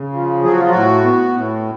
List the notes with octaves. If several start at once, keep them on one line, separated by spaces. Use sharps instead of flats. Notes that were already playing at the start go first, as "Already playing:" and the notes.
Already playing: C#3
F3
F#3 G#4
F#4
F4
A2 F#4
B3
A2